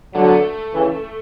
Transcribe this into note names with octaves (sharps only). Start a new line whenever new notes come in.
D3 F#3 A3
B3
A3
C#3 E3